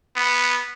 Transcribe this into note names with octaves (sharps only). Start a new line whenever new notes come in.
B3